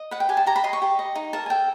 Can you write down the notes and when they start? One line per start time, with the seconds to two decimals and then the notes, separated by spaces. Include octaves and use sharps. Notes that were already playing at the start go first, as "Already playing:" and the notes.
Already playing: D#5
0.11 B4 F#5
0.20 G5
0.29 G4 G#5
0.37 A5
0.46 G4 A#5
0.56 B5
0.64 D#5 C6
0.73 C#6
0.82 G4
0.99 D#5
1.15 D#4
1.33 A#4 A5
1.46 G#5
1.50 A4 G5